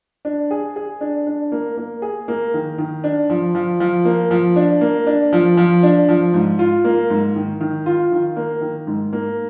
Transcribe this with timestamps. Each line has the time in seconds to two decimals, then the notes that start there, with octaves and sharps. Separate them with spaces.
0.25 D4
0.51 G#4
0.76 G#4
1.01 D4
1.27 D4
1.52 A#3
1.77 A#3
2.02 G#4
2.28 A#3
2.54 D#3
2.78 D#3
3.04 D4
3.30 F3
3.55 F3
3.80 F3
4.05 A#3
4.31 F3
4.56 D4
4.81 A#3
5.07 D4
5.32 F3
5.57 F3
5.83 D4
6.09 F3
6.33 G#2
6.59 F4
6.84 A#3
7.10 G#2
7.36 D#3
7.60 D#3
7.86 F4
8.12 D#3
8.36 A#3
8.61 D#3
8.87 G#2
9.13 A#3